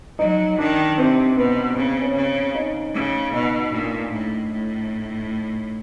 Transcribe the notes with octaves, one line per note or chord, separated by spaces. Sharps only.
F#3 D#4
D#3 D4
C3 C4
B2 B3
C#3 C4
C#4
C#3
D#4
C#3
B2 D#4
A#2 D4
A2
A2